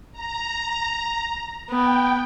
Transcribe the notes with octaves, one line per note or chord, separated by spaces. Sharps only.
A#5
B3 G5